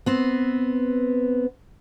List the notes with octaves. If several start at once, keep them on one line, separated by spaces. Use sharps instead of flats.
B3 C4